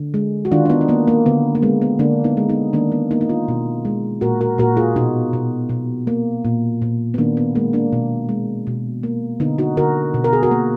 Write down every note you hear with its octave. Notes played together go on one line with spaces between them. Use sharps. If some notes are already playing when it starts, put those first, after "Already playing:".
Already playing: D3
G#3
F#4
D#3 D4 F4
D4
B3 D#4
D4
A#3 B3
A#3
D3 B3
A#3
G#3 B3
B3
D3 A#3 D4
B3 D#4
G#3
B3 D#4
D#3 A#3 D4
B3
A#3 B3 D#4
D#4
D4 F4
B2
G#3
A#2 F#4 A#4
F#4 A#4
A#2 F#4 A#4
F4 G#4
B2 D#4 F#4
B2
B2
A#3
A#2
A#2
B3
D#3 A#3 D4
B3
G#3 A#3
A#3 D4
B2
G#3
B2
A#3
D3 B3 D#4
D#4 F#4
D3 F#4 A#4
B2
A#4
G#4
F#4 A#4
A#3